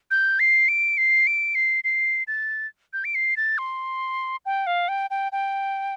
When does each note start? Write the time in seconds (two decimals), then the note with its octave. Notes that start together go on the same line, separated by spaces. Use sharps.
0.11 G6
0.40 C7
0.68 D7
0.98 C7
1.27 D7
1.55 C7
1.84 C7
2.28 A6
2.93 G6
3.04 D7
3.15 C7
3.37 A6
3.58 C6
4.46 G5
4.67 F5
4.88 G5
5.10 G5
5.32 G5